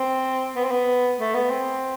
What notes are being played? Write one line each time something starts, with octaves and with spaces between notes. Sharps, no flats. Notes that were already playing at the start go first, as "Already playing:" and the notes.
Already playing: C4
B3
C4
B3
A3
B3
C4